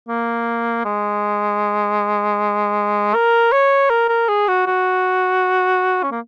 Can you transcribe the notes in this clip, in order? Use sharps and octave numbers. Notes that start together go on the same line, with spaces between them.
A#3
G#3
A#4
C#5
A#4
A#4
G#4
F#4
F#4
C#4
A#3